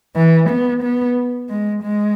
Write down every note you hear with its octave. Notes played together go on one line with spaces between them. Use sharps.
E3
B3
B3
G#3
G#3